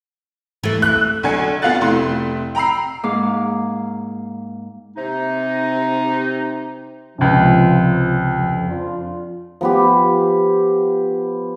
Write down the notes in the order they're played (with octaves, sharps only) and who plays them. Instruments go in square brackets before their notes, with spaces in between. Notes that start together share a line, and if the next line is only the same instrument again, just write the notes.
[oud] E3 A3
[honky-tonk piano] F#6
B1 D3 G#5 G#6 C#7
B3 F4 F5 F#5 F#6 A6
F1 A3 E4 C6
G5 A#5 B5 E6 C7
[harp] G#2 A#3 F5 D6
[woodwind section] C3 D#4
[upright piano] C#2 C3 [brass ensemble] F3
[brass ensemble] F2
F2 D4 F4
[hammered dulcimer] F3 B3 G4